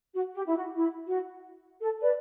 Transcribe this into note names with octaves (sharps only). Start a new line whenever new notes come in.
F#4
G4
E4
F#4
E4
F#4
A4
B4 D5